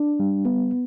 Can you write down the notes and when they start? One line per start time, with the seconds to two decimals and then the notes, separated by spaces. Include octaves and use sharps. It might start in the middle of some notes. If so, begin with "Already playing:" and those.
Already playing: D4
0.20 G3
0.45 B3